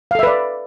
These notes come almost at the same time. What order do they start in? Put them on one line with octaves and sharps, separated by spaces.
F5 A4 E5 B4 D5